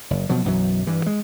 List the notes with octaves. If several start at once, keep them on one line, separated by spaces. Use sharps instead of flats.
F#1
B2 F3 F#3
B1 F#2 E3 F#3
G2 E3
G#3